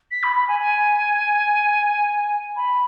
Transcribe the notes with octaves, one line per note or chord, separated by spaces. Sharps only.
B6
B5
B5
G#5
G#5
B5